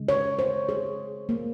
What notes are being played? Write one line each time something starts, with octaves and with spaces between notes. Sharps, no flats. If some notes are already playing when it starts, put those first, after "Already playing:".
Already playing: C#3 G#3
C#5
C5
G#4
A#3